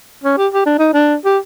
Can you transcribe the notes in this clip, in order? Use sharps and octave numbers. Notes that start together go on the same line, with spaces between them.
C#4
G4
G4
D4
D#4
D4
G4